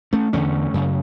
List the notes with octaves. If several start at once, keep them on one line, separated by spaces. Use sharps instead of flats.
A3 C#4
E2 D3 A3 C#4
F#2 C#3